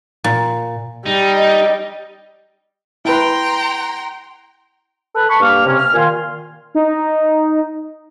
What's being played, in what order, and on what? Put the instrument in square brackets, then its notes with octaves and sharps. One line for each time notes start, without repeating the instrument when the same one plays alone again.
[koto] A#2
[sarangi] G3 [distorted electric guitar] D#4
[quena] D#5
[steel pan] E4 B4 [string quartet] G5 A#5 C6
[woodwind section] A4 B4
A5 B5 C#6
G2 A#3 F6
C3 C#4
F6
A#2 D#3 F5 G#5 C6
[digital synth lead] D#4